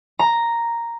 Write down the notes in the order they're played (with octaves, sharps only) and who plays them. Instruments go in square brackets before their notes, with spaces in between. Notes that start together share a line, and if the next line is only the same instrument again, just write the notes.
[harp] A#5